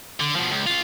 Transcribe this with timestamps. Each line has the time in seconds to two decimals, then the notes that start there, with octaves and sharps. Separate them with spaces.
0.20 D3
0.36 B2 F3
0.51 C#2
0.67 C#2 F4